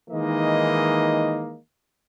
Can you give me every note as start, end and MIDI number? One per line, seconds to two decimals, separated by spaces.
0.10 1.57 51
0.10 1.57 52
0.10 1.57 56
0.10 1.57 58
0.10 1.57 63
0.10 1.57 75